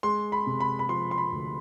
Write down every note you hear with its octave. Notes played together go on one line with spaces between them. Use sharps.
G#3 C6
B5
C3
B5
B5
F3 C6
C6
B5
D2